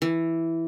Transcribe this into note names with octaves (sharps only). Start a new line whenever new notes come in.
E3